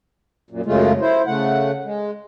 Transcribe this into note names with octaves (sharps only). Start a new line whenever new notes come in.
F#2 A#2
F#2 C#3 G#3 A3 F4
E4 C5
C#3 A3 F#5
G#3